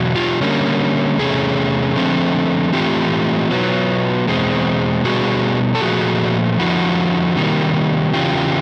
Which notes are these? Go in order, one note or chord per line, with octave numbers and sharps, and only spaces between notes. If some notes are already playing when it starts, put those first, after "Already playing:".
Already playing: E2 B2 F#3
F4 G4
D3 G3 A#3 C#4
E2 C3 A3 C#4 G#4
D3 F3 A3 C4
A2 E3 A3 C4 F4 G4
B2 F#3 B3
E2 B2 G#3 C4
B2 G3 B3 F#4 G#4
A4
A#2 F3 A3 F#4 G#4
F2 D3 F3 E4 F#4
C3 D#3 G3 A#3
E2 C#3 E3 F4 G4